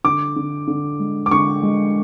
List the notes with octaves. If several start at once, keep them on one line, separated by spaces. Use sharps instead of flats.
D3 D6
D3
D3
G#3
D6
D3 C#6
G#3